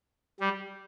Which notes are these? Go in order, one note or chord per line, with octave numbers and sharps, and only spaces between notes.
G3